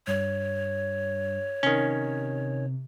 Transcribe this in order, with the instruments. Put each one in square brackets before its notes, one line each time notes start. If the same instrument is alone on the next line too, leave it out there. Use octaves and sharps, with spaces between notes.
[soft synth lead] G2 [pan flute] C#5
[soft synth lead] C3 [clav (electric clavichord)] D#3 C#4